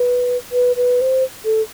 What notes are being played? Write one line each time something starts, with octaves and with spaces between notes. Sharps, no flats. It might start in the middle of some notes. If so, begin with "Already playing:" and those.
Already playing: B4
B4
B4
C5
A4